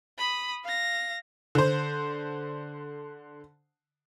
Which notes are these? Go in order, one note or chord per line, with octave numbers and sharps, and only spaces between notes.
B5 D#6
F5 A#6
D3 C5